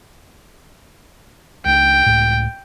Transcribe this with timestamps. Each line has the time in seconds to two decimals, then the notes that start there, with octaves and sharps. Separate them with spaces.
1.66 C#2 D4 G5
2.06 C#2 A2